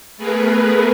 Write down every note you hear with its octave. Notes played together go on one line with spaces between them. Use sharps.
A3 B3 G#4 A#4 B4